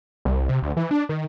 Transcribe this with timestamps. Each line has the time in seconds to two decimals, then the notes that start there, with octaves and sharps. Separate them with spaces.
0.25 C2
0.49 C3
0.62 D2
0.77 E3
0.91 D4
1.09 D#3